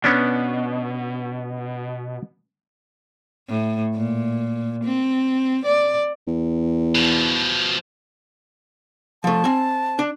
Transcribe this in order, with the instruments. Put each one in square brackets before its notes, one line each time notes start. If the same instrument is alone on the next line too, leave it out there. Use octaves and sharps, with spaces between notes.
[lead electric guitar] B2 [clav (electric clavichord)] B3 C#4 D4
[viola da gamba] A2
A#2
C4
D5
[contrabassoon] E2
[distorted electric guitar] B2 F3
[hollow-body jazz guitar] F3 A3 [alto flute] A5
[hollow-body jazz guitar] C4 G#5
D4